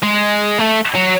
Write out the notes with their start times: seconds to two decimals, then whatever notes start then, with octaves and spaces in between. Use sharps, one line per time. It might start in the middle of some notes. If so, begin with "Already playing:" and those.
0.03 G#3
0.59 A3
0.95 F#3